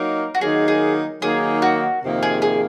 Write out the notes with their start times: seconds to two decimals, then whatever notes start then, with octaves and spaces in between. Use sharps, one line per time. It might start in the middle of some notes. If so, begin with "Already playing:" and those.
Already playing: F#3 A#3 D#4 A#4
0.35 F#4
0.41 D#3 F#3 A#3 D#4 G#4
0.68 G#4
1.21 D#3 F#3 A#3 D#4 G#4
1.62 F#4
2.03 F2 C3 D#3 A#3
2.23 G#4
2.42 G#4